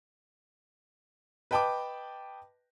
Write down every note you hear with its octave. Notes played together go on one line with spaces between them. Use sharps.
B4 D#5 G5 A5 B5 D6